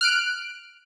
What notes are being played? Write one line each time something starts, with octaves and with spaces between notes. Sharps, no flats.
F6 F#6 D7